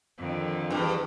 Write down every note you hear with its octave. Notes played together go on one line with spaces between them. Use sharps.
F2 D3 D#3
E2 G2